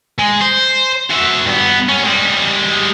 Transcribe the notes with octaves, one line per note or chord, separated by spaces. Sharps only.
G#3
C5
F#4 E5
G2 B3
C2 C#4
G3 G#3